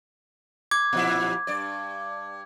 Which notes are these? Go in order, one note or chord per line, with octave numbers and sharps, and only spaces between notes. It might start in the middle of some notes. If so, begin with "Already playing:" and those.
D6 G#6
A#2 F3 E4
G2 D5